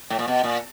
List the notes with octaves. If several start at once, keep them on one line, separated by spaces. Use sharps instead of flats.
A2
A#2
B2
A#2